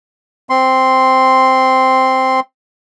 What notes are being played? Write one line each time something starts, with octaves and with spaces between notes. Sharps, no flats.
C4 C6